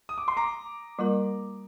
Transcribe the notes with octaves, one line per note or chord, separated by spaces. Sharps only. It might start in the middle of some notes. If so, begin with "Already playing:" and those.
D#6
D6
C6
A#5 D6
G3 A#3 F4 A#4